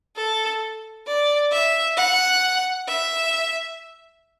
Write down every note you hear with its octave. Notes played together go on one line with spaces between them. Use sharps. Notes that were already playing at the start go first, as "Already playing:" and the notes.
A4
D5
E5
F#5
E5